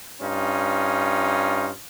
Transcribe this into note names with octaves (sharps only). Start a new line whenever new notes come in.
G2 C#4 D#4 F4